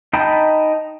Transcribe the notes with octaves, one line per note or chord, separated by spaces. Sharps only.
D#4 D#5 G5 A5 B5